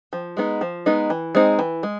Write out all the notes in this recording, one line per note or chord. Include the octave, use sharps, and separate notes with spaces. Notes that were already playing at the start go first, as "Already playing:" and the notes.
F3
G#3 B3 D#4
F3
G#3 B3 D#4
E3
G#3 C4 D#4
E3
G#3